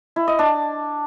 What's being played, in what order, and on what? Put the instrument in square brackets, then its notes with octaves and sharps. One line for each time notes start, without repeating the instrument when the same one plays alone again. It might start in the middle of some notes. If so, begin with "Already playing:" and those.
[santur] E4
D#5
D4